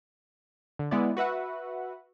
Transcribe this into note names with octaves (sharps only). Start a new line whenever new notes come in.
D3
G#3 B3 E4 D5
F#4 B4 E5 F#5